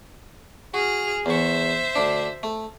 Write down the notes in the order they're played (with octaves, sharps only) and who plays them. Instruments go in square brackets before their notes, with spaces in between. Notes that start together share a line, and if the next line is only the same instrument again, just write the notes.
[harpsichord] F#4 [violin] G#4 F6
[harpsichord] E2 C#6 [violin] C5 E5
[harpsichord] D2 D4
A3